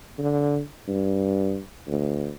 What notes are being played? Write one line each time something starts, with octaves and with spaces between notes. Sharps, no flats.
D3
G2
D2